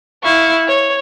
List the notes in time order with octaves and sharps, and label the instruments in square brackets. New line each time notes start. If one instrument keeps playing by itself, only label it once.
[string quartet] E4 F5 C#6
C#5